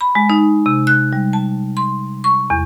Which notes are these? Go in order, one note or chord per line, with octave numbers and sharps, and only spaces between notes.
B5
G#3
D#4
C3
F#6
G3
A5
C6
C#6
E2